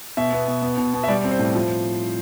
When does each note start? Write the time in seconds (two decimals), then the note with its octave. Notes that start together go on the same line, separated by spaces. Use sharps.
0.17 B2 E5
0.33 B3
0.48 B2
0.62 B3
0.77 B2
0.94 B2
1.04 E5
1.08 G3 D5
1.24 C4
1.31 C5
1.39 A2
1.55 F3